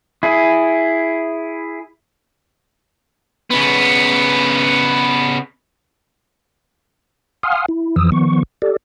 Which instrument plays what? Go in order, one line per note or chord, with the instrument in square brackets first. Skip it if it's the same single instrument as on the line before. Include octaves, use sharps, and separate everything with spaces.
[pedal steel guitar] E4 G#4
[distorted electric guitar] C#3 B3
[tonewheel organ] F5 F#5 G#5 C6 D#6 F6
E4
F2 E3 F3 D#6 E6
D#3 F3 B3 C#6
G4 A4 D5